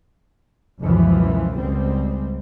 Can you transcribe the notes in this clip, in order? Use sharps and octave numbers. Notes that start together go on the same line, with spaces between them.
F#1 C#2 F#2 B2 E3 F3
C#2 G3 C4